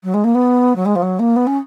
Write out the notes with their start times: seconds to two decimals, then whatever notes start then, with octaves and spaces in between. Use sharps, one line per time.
0.03 F#3
0.14 G#3
0.24 A#3
0.34 B3
0.75 F#3
0.85 G#3
0.95 F3
1.02 F#3
1.19 A#3
1.36 B3
1.47 C#4